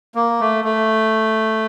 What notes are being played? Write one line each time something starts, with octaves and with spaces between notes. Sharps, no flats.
A#3
A3
A3